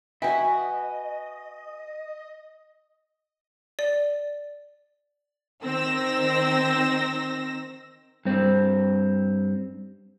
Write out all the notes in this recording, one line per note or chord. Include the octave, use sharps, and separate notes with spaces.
F#4 B4 D#5 E5 G5 G#5
D5
D#3 C4 E6 A#6
G2 C4